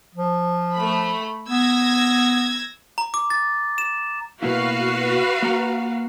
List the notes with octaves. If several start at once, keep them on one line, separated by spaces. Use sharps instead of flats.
F3
A3 B5
B3 E6 G#6 A#6
A#5
D6
A6
E7
B2 A#3 E4 F#4 B4 F5
A#3 F#5 A#5